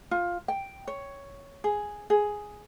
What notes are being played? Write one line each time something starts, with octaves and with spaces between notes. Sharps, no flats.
F4
G5
C#5
G#4
G#4